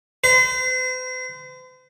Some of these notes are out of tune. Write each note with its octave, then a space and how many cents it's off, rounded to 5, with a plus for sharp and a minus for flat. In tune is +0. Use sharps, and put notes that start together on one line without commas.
C5 -45